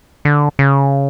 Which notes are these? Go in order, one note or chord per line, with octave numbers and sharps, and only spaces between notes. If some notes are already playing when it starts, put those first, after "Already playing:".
D3
C#3